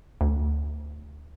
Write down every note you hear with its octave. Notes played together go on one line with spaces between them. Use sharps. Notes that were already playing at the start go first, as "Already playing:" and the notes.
D2